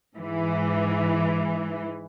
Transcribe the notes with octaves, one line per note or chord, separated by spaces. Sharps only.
G#2 E3